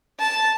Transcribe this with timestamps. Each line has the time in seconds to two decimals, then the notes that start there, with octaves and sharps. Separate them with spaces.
0.19 A5